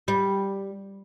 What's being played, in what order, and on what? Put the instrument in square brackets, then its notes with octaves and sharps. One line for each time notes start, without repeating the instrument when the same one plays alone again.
[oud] G3